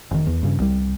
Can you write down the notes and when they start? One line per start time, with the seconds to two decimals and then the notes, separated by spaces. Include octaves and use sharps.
0.11 F1 D#3
0.27 E2
0.43 G2 C#3
0.60 C2 G3